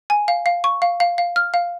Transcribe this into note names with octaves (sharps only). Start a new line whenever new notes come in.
G#5
F5
F5
C#6
F5
F5
F5
F6
F5